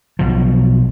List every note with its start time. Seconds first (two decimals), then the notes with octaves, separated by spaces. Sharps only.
0.19 B1 B2 F3